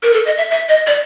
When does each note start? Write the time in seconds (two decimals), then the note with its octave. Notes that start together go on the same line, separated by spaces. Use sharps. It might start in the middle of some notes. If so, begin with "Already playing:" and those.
0.03 A#4
0.14 A4
0.26 D#5
0.38 E5
0.50 E5
0.69 D#5
0.87 D5